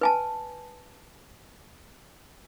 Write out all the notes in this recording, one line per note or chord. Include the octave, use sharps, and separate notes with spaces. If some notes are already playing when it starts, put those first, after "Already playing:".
B4 G#5 A5